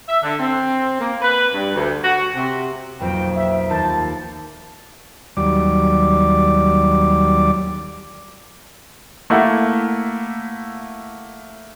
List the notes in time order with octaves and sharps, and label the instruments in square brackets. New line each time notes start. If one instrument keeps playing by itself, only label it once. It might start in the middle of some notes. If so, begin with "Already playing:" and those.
[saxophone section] E5
D3
C4
A#3
B4
G2
D2
F#4
C3
[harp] B1 F2 A#3 [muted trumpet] G5
[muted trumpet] E5
[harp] D#2 A#3 G6 [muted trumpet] A5
[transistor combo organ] D#2 F#3 G3 D5 D6
[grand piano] A3 A#3 E4 F#5